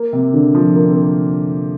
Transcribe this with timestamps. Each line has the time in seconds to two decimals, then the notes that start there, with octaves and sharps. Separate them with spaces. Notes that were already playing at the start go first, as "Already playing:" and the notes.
Already playing: A#3
0.13 C3
0.34 D3
0.55 F3
0.76 A#3
0.84 C4
0.92 A#3